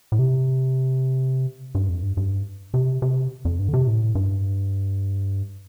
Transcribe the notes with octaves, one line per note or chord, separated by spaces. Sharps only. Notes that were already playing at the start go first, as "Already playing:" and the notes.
A2
C3
G2
F2
G2
G2
C3
C3
F2
G2
D3
C3
A2
G2